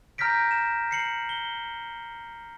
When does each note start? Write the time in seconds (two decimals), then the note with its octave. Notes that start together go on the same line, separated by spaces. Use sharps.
0.18 A#5 F6 G6 A#6 B6 D7
0.51 E7
0.91 C7 C#7 F#7
1.29 G7